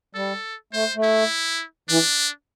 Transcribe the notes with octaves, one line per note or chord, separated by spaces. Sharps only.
G3 A4
A3 C5
A3
E4
E3 D4